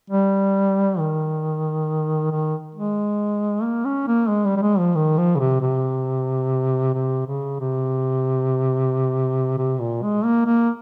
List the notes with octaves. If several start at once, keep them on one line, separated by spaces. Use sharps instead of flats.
G3
D#3
D#3
G#3
A#3
C#4
A#3
G#3
G3
G3
G#3
F3
D#3
F3
C#3
C3
C3
C3
C#3
C3
C3
A#2
G#3
A#3
A#3